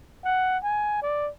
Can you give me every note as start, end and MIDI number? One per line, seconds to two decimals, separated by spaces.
0.25 0.58 78
0.63 1.00 80
1.02 1.30 74